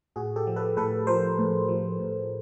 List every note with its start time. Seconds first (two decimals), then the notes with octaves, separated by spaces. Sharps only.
0.16 A2 F#4 G#4
0.36 G4 A4
0.47 F3
0.56 A4 B4
0.77 A2 A4 B4
1.07 F3 A#4 C5
1.38 A2
1.69 F3
1.99 A2